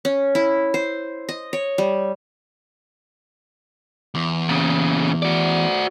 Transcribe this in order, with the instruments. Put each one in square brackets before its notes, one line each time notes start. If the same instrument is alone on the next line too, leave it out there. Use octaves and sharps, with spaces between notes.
[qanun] C#4
E4
C5
D#5
C#5
G3
[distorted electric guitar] E2
[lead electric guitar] A#2 C#3
F#4 D5